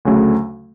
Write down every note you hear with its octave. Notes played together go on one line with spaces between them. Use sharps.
D2 C#3 F#3 A3 C#4